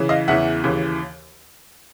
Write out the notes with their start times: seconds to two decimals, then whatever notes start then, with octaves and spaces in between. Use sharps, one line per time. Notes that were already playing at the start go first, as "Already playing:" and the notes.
Already playing: C#3 E3
0.09 D#5 F5
0.28 E2 C#3 E3 E5 F#5
0.64 D#2 C#3 E3